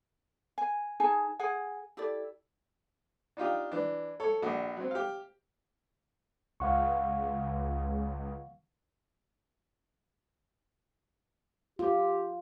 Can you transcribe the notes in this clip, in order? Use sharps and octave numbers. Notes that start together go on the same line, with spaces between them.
G#5
D#4 G#4 G#5 A5
G#4 F#5 G#5
E4 G4 A4 D5
D4 D#4 F4 G4
E3 D4
A4 C#5
A#1 D4 F#4
F#3 C4
G4 F5
C#2 F5 F#5 C#6
F4 G4